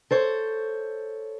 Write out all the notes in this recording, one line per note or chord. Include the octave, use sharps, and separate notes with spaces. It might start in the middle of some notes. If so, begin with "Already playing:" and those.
A4 C5 C#5